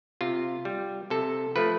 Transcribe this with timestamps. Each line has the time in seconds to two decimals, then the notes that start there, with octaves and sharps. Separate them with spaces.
0.21 C3 F4
0.65 G3
1.10 C3 A4
1.56 F3 A3 B4